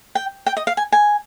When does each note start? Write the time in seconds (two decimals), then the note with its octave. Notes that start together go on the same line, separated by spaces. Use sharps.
0.15 G5
0.46 G5
0.57 D#5
0.67 F5
0.77 G#5
0.92 G#5